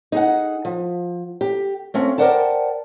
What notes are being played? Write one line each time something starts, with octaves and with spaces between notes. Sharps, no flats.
D#4 G#4 F#5
F3
G4
A3 C4 C#4 F5
A#4 C5 D5 F#5 G5 A5